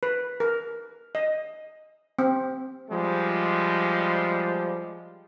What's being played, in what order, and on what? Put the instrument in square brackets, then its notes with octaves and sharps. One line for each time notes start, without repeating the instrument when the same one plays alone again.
[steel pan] B4
A#4
D#5
C4
[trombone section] F3 G3 G#3